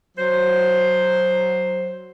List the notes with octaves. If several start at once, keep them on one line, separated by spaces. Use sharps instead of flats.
F#3 C5